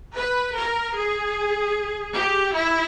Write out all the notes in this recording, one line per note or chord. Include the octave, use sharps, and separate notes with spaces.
B4
A#4
G#4
G4
E4